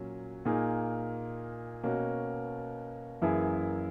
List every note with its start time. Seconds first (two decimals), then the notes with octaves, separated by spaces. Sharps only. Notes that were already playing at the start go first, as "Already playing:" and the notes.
Already playing: A#2 F#3 A#3 C#4
0.45 A#2 A#3 D#4 G#4
1.84 B2 A#3 C#4 F#4
3.22 F#2 E3 A#3 E4 G#4